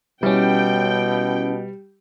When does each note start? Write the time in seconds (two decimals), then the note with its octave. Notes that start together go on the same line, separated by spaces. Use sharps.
0.23 B2 G3 C#4 E4 G5